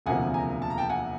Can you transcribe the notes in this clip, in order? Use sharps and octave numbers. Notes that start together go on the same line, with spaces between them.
E1 D2 C3 F3 A#3 F#5 G#5
G#5 A#5
A5
A#5
G5 A5
F#5 G#5